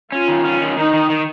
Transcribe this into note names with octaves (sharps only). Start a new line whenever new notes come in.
C#4 F4
D#3
C#4
D#3
D#3 D#4
D#3
D#3